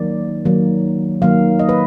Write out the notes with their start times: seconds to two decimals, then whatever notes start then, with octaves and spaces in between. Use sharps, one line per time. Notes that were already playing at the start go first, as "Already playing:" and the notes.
Already playing: D#3 F#3 A#3 D5
0.45 D#3 F#3 A#3
1.22 D#3 F#3 A#3 F5
1.59 D#5
1.69 B4